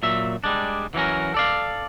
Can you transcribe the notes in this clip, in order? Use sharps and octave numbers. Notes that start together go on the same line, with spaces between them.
A#2 F#3 E5
G3 G#3 D4
E3 F#3 C#4 A#4
A4 D5 F5